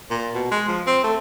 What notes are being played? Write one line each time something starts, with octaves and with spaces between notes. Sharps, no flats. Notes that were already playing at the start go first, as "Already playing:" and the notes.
A#2
B2
G#3
F3
C4
A3